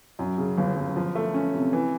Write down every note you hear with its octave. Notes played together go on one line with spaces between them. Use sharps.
F#2
C#3
G1
G1
F3
A3
C#4
C3
E3